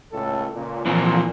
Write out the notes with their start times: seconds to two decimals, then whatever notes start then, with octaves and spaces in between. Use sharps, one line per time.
0.13 C#2 A2 A4
0.55 C#2 A#2
0.86 A#2 E3 F3 C4